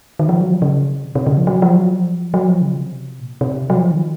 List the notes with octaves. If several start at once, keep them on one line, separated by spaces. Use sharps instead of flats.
D#3
F3
F#3
F3
C#3
C3
C3
C#3
F3
F#3
F3
F#3
F3
F#3
F3
C#3
C3
A#2
C3
F#3
F3
D#3